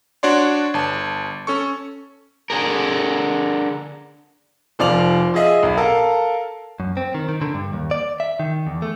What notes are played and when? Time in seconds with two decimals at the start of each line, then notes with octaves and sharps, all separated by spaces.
0.23 D4 F#4 C#5 D5 C6
0.74 G1 A5
1.47 C#4 A4 C#6
2.50 D3 G#4 A#4
4.79 F1 F3 D5 D6 F7 F#7
5.34 F4 G#4 D#5 E5
5.63 B1
5.77 A4 A#4 F5 A5
6.80 F#2
6.97 C4
7.14 D#3
7.29 D#3
7.42 D3
7.54 G2
7.73 D#2
7.91 D5
8.20 E5
8.40 D#3
8.66 E2
8.82 A3